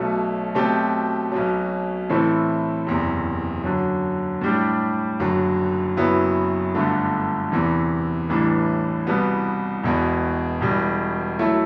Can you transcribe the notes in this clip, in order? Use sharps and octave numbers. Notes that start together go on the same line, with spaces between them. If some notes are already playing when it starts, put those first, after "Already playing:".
Already playing: B1 B2 F#3 A3
B2 F#3 A3 C4 G4
B1 B2 F#3
A2 E3 A3 C4 E4
F#1 E2 C3
F#2 D3 F#3
A2 G3 D4 G4
F#1 F#2 D3 F#3
F#1 F#2 F#3 B3 E4
G1 G2 D3 A3
E2 C3 E3
A1 A2 E3 G3 D4
C2 B2 G3 B3
E1 E2 B2
E1 E2 B2 G3
F#3 A3 E4